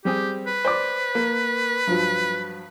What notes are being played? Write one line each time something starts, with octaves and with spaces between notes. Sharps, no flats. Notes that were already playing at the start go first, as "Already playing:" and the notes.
G3 C4 G4 G#4
B4
C5 D5 D6
A#3
G2 F3 F#3